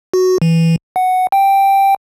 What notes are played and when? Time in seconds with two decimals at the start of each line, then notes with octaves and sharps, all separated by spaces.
0.14 F#4
0.42 E3
0.96 F#5
1.32 G5